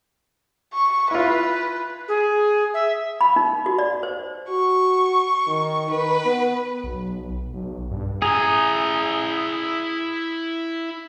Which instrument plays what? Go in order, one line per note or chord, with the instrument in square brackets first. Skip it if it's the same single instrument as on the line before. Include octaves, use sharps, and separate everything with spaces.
[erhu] C#6
[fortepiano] E4 F4 [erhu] B4
[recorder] G#4
E5
[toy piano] B5
D#4
F#4
D5
C5
[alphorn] F#4 [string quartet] C#6
[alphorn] D#3
[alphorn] D#3 [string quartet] B4
[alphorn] B3
[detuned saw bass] B1
B1
G2
[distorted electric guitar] E4 A#5 [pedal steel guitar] G#4